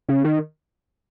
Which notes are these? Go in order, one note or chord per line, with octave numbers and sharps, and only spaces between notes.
C#3
D#3